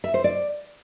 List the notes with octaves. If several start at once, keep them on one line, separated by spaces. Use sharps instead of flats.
E5
C5
D5